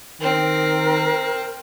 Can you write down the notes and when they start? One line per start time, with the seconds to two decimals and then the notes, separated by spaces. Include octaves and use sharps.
0.20 D#3 C4 A#4